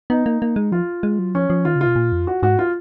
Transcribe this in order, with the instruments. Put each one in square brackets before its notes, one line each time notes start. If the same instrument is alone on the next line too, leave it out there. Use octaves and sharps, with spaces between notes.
[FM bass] B3 [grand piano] D#4
[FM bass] A#3
A#3
G#3
[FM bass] F3 [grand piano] F4
[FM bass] G#3
F#3
[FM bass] F3 [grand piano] C#4
[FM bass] F3
[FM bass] D#3 [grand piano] F4
[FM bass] C#3
[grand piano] F4
[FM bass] B2
A#2
F2
[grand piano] F#4
[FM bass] G#2 [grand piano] F#4
[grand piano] F4